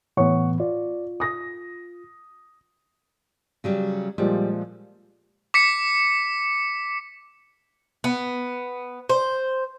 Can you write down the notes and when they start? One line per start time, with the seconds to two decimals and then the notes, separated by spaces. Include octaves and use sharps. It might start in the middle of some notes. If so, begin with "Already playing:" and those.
0.17 A2 E3 B3 C#5 F#5 C#6
0.60 F4 D5
1.20 D#6 A#6
3.64 C#3 F#3 G3
4.18 A#2 F3 G3 G#3
5.54 D6 B6 C#7
8.04 B3
9.09 C5